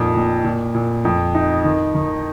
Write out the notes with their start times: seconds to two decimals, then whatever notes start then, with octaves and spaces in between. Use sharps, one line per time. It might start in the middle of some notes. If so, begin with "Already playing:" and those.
Already playing: F2 A#2 D#4
0.15 A#2
0.44 A#2
0.75 A#2
1.05 F2
1.35 D#4
1.64 D#3
1.94 D#3